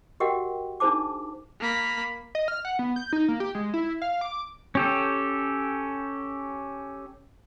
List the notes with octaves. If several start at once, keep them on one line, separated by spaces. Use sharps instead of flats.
F#4 G4 A#4 D#5 F#5 G5
D4 D#4 G#4 C5 A5 D6
A#3 B5
D#5
F6
F#5
B3
G6
D#4
A#3
G4
G#3
E4
F5
D6
C#4 G4 A4